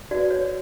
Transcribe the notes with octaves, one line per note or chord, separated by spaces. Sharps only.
F#4 B4 D5
C#5